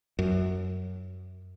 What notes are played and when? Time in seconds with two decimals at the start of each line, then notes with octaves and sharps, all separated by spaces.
0.19 F#2